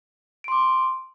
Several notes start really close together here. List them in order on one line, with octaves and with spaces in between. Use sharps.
D7 C6 D6